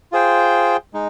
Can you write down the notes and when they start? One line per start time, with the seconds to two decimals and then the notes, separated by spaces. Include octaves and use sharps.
0.12 F4 G#4 C5 G5
0.93 G#3 D#4